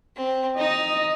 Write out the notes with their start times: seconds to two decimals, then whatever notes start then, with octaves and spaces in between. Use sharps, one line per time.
0.16 C4
0.58 D#4 D#5